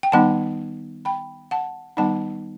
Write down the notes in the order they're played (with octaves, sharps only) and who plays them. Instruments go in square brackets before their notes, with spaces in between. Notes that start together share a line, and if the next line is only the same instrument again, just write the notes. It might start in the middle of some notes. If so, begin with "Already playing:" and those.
[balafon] G5
D#3 G3 B3 D#4 F#5 A5
G5 B5
F#5 A5
D#3 G3 B3 D#4 F#5 A5